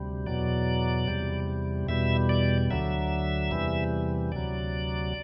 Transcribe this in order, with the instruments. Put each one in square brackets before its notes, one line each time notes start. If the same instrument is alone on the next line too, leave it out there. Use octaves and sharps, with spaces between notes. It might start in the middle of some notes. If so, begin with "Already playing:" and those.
Already playing: [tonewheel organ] D2 C3 G3
E2 B2 F#3 D5
E2 C3 G3
E2 B2 G3 E5
D5
D2 D3 F#3 E5
E2 C3 E3 G3
D2 C3 F#3 D5